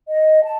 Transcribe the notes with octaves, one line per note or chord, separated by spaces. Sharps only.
D#5
A5